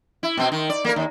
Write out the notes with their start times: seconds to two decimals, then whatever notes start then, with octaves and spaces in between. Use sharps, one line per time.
0.23 E4
0.37 B2 C4
0.52 D#3
0.70 D5
0.85 A#3 A#4
0.96 D#2